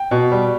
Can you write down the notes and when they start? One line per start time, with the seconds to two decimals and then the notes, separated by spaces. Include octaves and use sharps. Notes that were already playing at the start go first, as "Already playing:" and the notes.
Already playing: G5
0.11 B2
0.32 G3